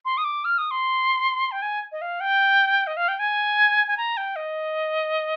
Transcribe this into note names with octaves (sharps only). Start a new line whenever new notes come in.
C6
D#6
D6
F6
D#6
C6
G5
G#5
D#5
F5
G5
D#5
F5
G5
G#5
G#5
A#5
G5
D#5